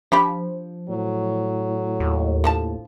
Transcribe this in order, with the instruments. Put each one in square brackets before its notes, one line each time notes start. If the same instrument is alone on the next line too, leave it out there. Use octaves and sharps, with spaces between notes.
[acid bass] F3 [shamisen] D4 G4 B5
[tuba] A2 [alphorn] F#3
[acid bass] D#2
[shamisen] D3 F3 A5